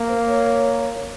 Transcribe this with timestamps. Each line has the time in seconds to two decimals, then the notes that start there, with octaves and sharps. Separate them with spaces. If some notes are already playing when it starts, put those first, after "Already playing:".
Already playing: A#3
0.08 C5
0.26 C#5